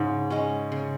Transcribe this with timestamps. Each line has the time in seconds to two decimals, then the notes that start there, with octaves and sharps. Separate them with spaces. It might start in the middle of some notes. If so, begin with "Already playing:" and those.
Already playing: G#2 C#3
0.30 G#3 C#4
0.72 C#3